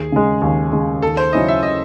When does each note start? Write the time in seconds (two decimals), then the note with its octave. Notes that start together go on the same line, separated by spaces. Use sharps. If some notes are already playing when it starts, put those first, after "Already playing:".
Already playing: D#2 G#4
0.12 C#3 G#3
0.42 D#2
0.72 C#3 G#3
1.02 D#2 A4
1.17 C5
1.33 C#3 F#3 C#4 E4 D#5
1.48 E5
1.63 D#5